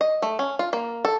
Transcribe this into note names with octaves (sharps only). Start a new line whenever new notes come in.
D#5
A3
C#4
F4
A#3
A4